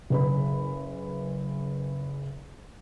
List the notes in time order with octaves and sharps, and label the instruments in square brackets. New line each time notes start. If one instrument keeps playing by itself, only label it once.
[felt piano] F#1 B4 B5